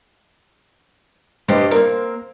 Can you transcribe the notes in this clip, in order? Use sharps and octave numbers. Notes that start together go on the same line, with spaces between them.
G2 G4 C5 D#5
A#3 C4 A#4